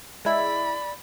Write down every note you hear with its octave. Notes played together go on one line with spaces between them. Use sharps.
G#3 E4 D5 B5